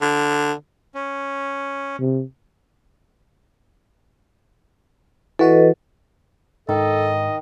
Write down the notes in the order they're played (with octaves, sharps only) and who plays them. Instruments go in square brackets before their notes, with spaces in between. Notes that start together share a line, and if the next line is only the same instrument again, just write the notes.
[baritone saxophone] D3
[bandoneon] C#4
[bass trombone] C3
[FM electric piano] E3 F#4 [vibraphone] A4 B4 D#5
[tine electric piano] G#2 [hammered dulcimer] D#3 [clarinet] A4 [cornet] D#5